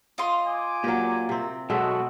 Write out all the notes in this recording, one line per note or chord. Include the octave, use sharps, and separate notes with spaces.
F4 D#5 C6
G#5 D6
A#2 F#3 A#3 G4
C3 C4
B2 F#3 G#3 F#4 A4 E5